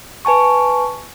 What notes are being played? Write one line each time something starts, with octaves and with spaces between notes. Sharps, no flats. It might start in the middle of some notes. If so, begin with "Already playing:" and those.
B4 G#5 A5 C#6